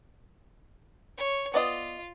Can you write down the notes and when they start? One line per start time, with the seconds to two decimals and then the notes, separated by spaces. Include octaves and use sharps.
1.18 C#5
1.54 B3 F4 D5 D#5